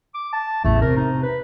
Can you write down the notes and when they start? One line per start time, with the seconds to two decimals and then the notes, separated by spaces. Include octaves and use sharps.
0.15 D6
0.33 A5
0.64 A1 E2 A3
0.82 C3 A#4
0.97 D#4
1.23 B4